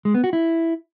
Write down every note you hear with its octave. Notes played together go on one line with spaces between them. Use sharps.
G#3
B3
F#4
E4